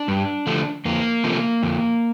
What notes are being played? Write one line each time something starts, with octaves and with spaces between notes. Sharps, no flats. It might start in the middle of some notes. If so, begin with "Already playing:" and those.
Already playing: D4
G2
D3 F3 A3
F2 A#3
C3 F3 A3
F2